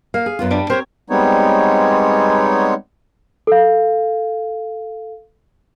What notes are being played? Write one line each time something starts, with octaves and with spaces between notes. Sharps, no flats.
A#3 F5
G#4
F#2 B3 F4
G3 D4
C4 G4 A#4 C5 C#5
G3 G#3 B3 C4 D#4 C#5
A4 F5